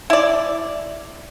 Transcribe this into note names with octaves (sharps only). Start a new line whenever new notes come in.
E4 D5